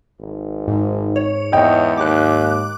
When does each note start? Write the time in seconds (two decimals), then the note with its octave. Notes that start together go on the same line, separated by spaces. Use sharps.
0.20 G#1
0.68 G#2
1.16 C#5
1.52 E2 D#5 G5
1.97 D#2 D6 F#6